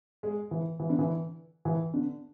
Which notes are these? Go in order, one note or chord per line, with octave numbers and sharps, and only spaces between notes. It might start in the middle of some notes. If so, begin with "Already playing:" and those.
G#3
E3
E3
D3
E3
E3
D3